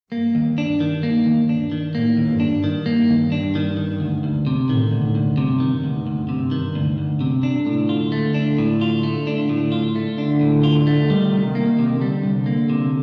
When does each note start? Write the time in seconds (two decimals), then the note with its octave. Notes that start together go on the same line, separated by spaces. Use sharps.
0.11 G2 A#3
0.35 D#2
0.58 D4
0.80 D#3
1.03 A#3
1.26 D#2
1.49 D4
1.72 D#3
1.95 A2 A#3
2.17 D#2
2.25 G2
2.40 D4
2.55 G2
2.64 D#3
2.86 A#3
3.09 D#2
3.32 D4
3.55 D#3
3.77 D#3
4.00 D2
4.24 D2
4.47 C3
4.68 A2 D#3
4.91 D2
5.00 A2
5.15 D2
5.31 G2
5.38 C3
5.60 D#3
5.84 D2
6.07 D2
6.29 C3
6.51 D#3
6.75 D2
6.98 D2
7.21 C3
7.43 D3 D4
7.67 A2
7.89 F4
8.12 A3
8.34 D4
8.58 A2
8.81 F4
9.03 A3
9.27 D4
9.49 A2
9.72 F4
9.96 A3
10.18 D3 D4
10.41 A2
10.63 F4
10.87 A3
11.10 D#3 G3
11.33 C2
11.55 A#3
11.79 C3
12.01 D3 G3
12.23 C2
12.46 A#3
12.70 C3